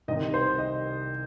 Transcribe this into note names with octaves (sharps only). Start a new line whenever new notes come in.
C2 C3 D#3 D#5
C5
D#5